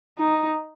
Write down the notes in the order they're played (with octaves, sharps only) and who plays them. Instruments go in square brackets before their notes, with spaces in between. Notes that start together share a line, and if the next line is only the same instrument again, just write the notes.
[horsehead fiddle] D#4